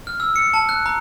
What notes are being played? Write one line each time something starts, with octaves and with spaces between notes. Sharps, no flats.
F6
E6
C#7
A5
F#6
A#5